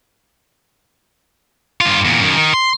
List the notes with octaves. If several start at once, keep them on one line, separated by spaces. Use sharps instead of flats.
G2 F4
E2 A#2
F#2 D#3
D#3
C6